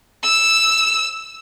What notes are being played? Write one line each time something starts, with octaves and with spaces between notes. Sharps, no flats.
E6